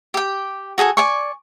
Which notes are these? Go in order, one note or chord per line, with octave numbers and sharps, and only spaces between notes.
G4 G5
F#4 G#4 A4 G#5
D5 G#5 C#6